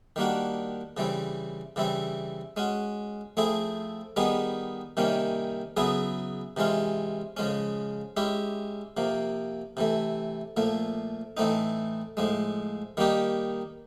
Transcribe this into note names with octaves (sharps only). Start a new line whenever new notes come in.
D#3 G3 A#3 D4 F#4
C#3 E3 G3 C4
C#3 E3 G3 C4 E4
G#3 C#4 F#4
F3 A3 C4 E4 G#4
D#3 G3 B3 D#4 G#4
C3 D#3 G3 A#3 C#4
C#3 F#3 B3 E4 G#4
C3 E3 G#3 C#4 F4
C#3 F3 G#3 C#4
G#3 C#4 E4 G4
C3 F3 A#3
C3 E3 A3
A#2 F3 A3
A2 E3 A3 C4 D#4
A2 F3 G#3
D#3 G3 A#3 D#4 G4